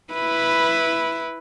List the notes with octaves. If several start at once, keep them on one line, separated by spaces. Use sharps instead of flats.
E4 B4